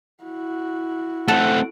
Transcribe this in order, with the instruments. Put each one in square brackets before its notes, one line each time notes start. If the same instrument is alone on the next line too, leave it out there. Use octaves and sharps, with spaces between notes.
[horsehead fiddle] E4 F#4
[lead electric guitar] A3 C4 [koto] A4 [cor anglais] F#5